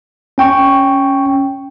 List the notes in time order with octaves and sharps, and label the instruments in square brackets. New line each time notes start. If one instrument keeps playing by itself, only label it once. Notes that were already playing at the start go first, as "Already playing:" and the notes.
[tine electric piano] C#4 G5 C#6